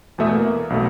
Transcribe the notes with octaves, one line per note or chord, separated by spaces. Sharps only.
E2 B2 A3 E5 D#6
A#3
B1 B2 A3